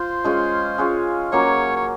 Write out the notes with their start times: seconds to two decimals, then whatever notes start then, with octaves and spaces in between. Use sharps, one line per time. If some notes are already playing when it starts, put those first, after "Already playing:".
Already playing: F4 C5
0.24 G#3 C#4 F4
0.78 G#3 C#4 F4
1.32 F#3 A#3 C#4 C#5
1.76 C#5